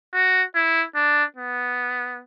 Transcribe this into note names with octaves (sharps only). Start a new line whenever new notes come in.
F#4
E4
D4
B3